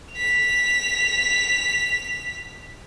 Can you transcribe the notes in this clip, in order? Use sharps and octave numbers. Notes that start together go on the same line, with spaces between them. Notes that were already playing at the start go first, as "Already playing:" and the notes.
B6 F7